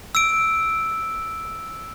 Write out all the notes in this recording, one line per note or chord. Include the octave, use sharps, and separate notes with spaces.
E6 D7